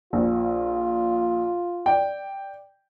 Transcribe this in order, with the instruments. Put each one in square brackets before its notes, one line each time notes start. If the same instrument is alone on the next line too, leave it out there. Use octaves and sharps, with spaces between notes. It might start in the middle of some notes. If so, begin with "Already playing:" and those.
[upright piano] A#1 [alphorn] F4
[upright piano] D5 G5